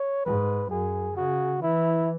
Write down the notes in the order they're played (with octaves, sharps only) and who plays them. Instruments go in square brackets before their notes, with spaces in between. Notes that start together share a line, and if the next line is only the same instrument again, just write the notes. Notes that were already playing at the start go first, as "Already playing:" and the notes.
Already playing: [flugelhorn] C#5
[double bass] G#2 [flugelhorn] B4
[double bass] F#2 [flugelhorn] G#4
[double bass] C#3 [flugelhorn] F#4
[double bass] E3 [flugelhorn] E4